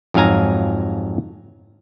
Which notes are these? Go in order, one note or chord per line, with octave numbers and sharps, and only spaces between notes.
F2 G#2 F#3 F5 G#5 A#5